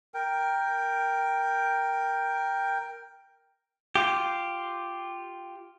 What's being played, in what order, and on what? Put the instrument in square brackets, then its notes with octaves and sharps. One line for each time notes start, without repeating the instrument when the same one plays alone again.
[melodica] A#4 G5
[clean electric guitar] F4 G4